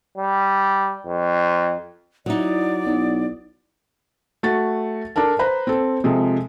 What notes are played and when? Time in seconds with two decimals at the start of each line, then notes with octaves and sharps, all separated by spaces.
0.18 G3
1.06 F2
2.26 F#3 D#4 E4 D5 F#5 D#6
2.85 B1
4.43 A3 F#4 A6
5.16 D4 A4 A#4 A5
5.39 B4 C5 A#5 B5
5.67 C4 A4
6.04 C3 F3 G#3 A4